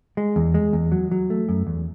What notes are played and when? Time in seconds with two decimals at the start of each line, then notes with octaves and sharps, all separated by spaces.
0.17 G#3
0.36 E2
0.54 G#3
0.73 E2
0.92 F#3
1.11 F#3
1.30 A3
1.49 F#2
1.67 E2